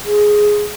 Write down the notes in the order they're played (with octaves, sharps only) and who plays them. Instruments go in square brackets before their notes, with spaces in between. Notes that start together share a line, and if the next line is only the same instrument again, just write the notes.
[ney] G#4